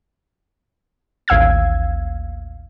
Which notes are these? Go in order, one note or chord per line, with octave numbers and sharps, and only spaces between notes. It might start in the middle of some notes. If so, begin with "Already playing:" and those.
A1 D#2 F5 E6 G#6